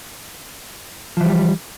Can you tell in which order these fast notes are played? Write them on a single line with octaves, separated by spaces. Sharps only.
F3 E3 G3